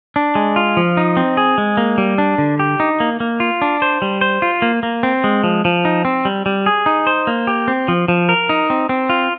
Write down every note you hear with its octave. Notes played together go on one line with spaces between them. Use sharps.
D4
G#3
F4
F3
D#4
C4
G#4
G#3
A#3
G3
D4
D3
G4
D#4
A#3
A#3
F4
D4
C5
G3
C5
F4
A#3
A#3
C4
G#3
F3
F3
D#4
C4
G3
G3
G#4
D#4
C5
A#3
G4
C4
F3
F3
A#4
D#4
C4
C4
F4